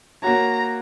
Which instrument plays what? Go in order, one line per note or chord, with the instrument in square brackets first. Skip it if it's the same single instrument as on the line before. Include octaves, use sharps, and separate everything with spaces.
[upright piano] A#3 F#4 C#5 [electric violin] A#5